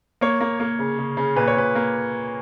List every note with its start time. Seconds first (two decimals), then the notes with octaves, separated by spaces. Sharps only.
0.21 A#3 C#5
0.40 A#3
0.60 A#3
0.79 C#3
0.99 C#3
1.17 C#3
1.36 A#2 B4
1.48 C#5
1.56 A#2 B4
1.75 A#3